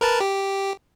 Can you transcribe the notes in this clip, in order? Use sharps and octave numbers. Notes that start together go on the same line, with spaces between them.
A#4 B4 A5
G4